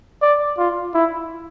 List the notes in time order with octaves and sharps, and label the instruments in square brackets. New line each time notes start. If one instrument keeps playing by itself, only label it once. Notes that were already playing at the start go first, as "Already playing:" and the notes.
[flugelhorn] D5
F4
E4